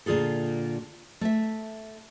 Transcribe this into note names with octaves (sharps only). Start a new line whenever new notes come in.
A#2 D3 F4 G#4 A4
A3 E5